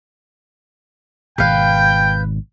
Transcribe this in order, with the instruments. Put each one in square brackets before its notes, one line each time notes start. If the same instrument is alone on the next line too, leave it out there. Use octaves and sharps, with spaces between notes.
[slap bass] G#1 B2 [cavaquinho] B4 F5 [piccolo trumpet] G5 [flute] G6